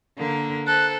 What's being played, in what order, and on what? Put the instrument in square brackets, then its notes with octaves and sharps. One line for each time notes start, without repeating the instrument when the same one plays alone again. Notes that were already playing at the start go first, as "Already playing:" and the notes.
[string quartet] D3 A#3 A#4
[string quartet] A4 C5 [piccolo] F#6